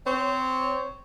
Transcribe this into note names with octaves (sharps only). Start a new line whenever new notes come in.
C4 C#5